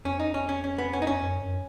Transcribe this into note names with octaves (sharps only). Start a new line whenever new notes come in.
F2 C#4
D#4
C#4
C#4
C#4
B3
C#4
D#4
C#4
F#2
F#2